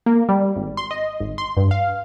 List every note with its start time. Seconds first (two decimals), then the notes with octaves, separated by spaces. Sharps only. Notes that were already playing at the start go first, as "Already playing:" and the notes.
0.06 A#3
0.29 G3
0.56 G#1
0.77 C6
0.91 D#5
1.20 G#1
1.38 C6
1.57 G2
1.71 F5